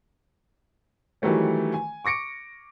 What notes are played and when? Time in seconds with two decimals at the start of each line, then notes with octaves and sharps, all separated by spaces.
1.22 D#3 E3 F#3 G3 A3 C#4
1.74 G#5
2.05 C#6 D6 A#6 C#7 D7